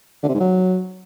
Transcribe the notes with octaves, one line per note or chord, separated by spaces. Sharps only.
D3
C3
G#2
F#3